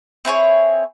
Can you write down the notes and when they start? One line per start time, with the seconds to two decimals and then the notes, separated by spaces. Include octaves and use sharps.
0.25 C4 E4 G#4 C#5